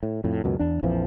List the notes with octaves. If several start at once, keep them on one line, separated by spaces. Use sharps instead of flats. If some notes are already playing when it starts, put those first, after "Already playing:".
A2
F2 A2
C#2 F#2 B2
E2 D4
A#1 F2 E3 F3